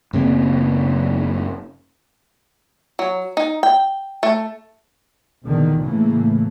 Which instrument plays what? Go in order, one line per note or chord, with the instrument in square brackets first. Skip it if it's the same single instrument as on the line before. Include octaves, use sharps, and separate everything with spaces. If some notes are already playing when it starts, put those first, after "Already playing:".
[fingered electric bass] F#1 C#3 A#3 C4
[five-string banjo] F#3
D#4
G5
A3
[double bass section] A#1 E2 D3 D#3
A2 C#3 E3 A3 A#3